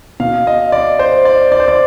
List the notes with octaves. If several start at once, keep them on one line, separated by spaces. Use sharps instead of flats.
B2 F5
D#5
D5
C5
D5
D5
C5
D5